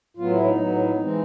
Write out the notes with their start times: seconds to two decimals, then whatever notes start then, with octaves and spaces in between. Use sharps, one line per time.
0.17 A2 F#3 B3 F4
0.31 E4
0.45 D#4
0.58 A2 F#3 B3
1.00 E3 G#3 C4